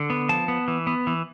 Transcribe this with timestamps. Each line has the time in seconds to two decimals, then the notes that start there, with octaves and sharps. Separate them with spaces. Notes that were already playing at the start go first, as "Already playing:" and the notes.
Already playing: D3
0.10 B3
0.29 F3 A5
0.48 B3
0.68 E3
0.87 B3
1.07 E3